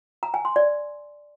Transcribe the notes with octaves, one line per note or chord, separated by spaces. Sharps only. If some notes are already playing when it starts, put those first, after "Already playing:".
A#5
G#5
C6
D5